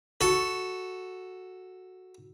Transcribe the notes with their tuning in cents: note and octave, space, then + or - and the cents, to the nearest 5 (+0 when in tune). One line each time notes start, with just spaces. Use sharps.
F#4 +0 A4 +0